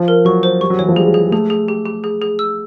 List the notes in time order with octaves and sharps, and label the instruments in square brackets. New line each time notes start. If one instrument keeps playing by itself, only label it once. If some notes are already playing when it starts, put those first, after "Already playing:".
Already playing: [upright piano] F3
[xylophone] A#4
[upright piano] F#3 [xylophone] C#6
[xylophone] C5
[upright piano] G3 [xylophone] C#6
[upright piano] F#3
[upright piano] E3 [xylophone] C#5
[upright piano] F3
[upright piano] G3 [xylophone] G#4
[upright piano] G#3
[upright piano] G3 [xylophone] G#4
[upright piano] G#3
[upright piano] A3 [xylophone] G#4
[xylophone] G#4
G4
G4
G#4
G#4
E6